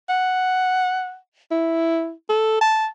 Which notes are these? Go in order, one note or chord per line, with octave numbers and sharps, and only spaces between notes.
F#5
E4
A4
A5